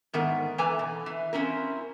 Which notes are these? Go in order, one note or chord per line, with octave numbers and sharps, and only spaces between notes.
G#2 D#3 B3 A#4
E3 A#3 A4 B4 G#5 A#5
B2
E3
A#3 C4 C#4 E4 A#4